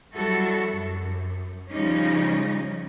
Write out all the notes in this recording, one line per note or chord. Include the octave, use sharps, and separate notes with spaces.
F#3 G3 E4 F#4 A4
F#2
C#3 F3 G3 C#4 D#4